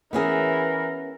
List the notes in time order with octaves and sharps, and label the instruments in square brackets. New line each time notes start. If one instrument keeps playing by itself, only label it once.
[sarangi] E3 [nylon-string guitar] B3 C#4 G#4 [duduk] A#4